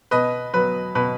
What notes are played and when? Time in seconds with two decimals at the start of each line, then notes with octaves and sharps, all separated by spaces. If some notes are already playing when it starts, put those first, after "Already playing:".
0.11 B2 B4 D#5
0.54 F#3 B3 B4
0.95 B2 B4